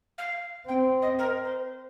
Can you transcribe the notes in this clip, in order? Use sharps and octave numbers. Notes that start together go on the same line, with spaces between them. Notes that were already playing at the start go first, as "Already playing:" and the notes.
F5
C4 G5
D#5
A#4
C5